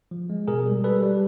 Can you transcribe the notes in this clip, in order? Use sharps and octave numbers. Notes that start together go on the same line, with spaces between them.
F3
G#3
B2 G#4 A#4
G3
G3 A4 B4
G3